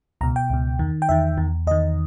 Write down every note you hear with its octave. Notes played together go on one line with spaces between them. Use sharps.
C#2 B2 A#5
G5
C#2 B2
E2 D#3
G5
E2 D#3 E5
E2 D#3
E2 D#3 D#5